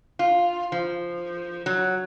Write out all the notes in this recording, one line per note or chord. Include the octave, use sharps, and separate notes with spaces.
F4
F3
F#3